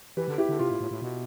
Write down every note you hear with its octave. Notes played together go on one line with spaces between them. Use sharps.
E3 G4 B4
D3
E4 G4
D3
C3 F4
A2
A2
A2
B2